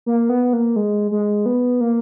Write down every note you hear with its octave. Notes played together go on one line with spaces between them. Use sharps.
A#3
B3
A#3
G#3
G#3
B3
A#3